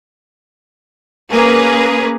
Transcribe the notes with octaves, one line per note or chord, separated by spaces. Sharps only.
A#3 C#4 G#4 A#4 B4